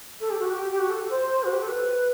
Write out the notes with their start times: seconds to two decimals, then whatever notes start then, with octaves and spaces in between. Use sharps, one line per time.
0.21 A4
0.30 G4
0.40 F#4
0.51 G4
0.72 G4
0.79 F#4
0.89 A4
1.10 C5
1.44 F#4
1.52 G4
1.61 A4
1.69 B4